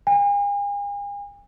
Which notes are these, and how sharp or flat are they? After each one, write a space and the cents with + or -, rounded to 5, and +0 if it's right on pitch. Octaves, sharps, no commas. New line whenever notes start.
G#5 -45